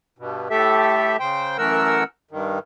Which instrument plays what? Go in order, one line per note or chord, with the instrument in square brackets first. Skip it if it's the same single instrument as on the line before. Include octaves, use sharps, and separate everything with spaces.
[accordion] G2 B2
A2 A3 G4 A4 E5
C#3 C5 G5
F#2 E3 A3 A#4 F#5 E6
G2 D#3